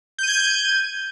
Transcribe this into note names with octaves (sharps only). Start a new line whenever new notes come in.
G6 G#6 D#7